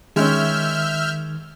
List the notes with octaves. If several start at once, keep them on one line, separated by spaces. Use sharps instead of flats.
D#3 G#3 C#4 E5 F6 G6